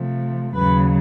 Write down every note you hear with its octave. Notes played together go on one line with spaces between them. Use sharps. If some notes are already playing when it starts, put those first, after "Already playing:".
Already playing: C3 F3 A3
D#2 C#3 F#3 B4